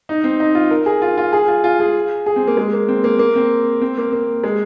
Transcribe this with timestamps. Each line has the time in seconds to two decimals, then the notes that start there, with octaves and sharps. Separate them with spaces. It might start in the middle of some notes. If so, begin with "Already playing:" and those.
0.09 D#4
0.24 C4
0.40 D#4
0.55 F4
0.71 A#4
0.86 G#4
1.02 F4
1.18 F4
1.33 G#4
1.48 F4
1.64 F4
1.80 G#4
2.26 G#4
2.36 C4
2.47 A#3
2.57 G#3
2.73 A#3
2.88 C4
3.04 A#3
3.19 A#3
3.36 C4
3.82 C4
3.98 A#3
4.12 A#3
4.44 G#3